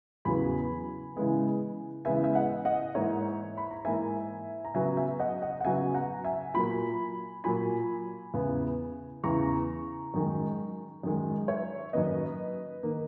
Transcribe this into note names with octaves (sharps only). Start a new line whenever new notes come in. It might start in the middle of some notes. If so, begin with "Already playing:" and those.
E2 C#3 F#3 B3 G#5 B5
C#3 E3 G#3 B3
C#3 E3 G#3 B3 E5 G#5
E5
D#5 F#5
D#5 F#5
G#2 E3 A#3 C#5 E5
B5
A#5
G#2 E3 A#3 E5 G#5
A#5
C#3 F#3 B3 E5 G#5
E5 G#5
D#5 F#5
D#5 F#5
F#5
C#3 F#3 B3 E5 G#5
F#5 A#5
E5 G#5
A#2 F#3 A#3 G#5 B5
A#2 F#3 A#3 G#5 B5
E2 C#3 E3 B3
E2 C#3 E3 B3 A#5 C#6
F#2 D#3 G#3
F#2 D#3 G#3
C#5 E5
F#2 D#3 A#3 B4 D#5
D#3 A#3